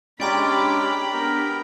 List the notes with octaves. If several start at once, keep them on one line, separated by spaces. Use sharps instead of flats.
G#3 C#4 D4 G4 G5 A#5 B5 D6
B3 G4 A#4